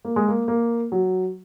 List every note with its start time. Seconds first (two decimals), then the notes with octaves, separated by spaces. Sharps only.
0.05 A#3
0.16 G#3
0.28 A#3
0.48 A#3
0.92 F#3